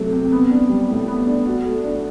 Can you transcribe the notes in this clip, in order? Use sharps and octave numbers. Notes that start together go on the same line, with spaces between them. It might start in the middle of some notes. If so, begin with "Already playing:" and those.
Already playing: C3 F#3 A3 C4
C4
B3
D4
G3
A2
B3
D4
F#4
A3
D4